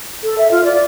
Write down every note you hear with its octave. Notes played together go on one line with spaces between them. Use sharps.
A4
E5
F4
D5